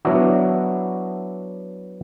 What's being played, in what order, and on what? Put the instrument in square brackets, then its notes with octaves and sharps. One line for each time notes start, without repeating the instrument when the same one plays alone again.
[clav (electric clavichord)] F#3 B3 D4 E4 F#4